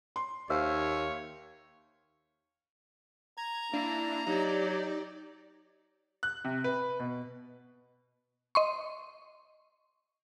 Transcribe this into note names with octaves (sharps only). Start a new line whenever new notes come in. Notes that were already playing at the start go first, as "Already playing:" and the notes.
C6
D#2 C5 C#5 E5 F5
A#5 G#6
A#3 D4 E4
F#3 D#4 G4 D5
F#6
C3
B4
B2
D#5 C6 C#6